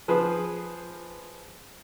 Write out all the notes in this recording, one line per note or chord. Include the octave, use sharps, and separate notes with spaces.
F3 G#4 B4 C5